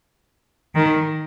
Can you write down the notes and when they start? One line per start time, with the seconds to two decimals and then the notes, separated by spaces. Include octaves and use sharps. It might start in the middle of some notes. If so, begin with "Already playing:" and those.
0.75 D#3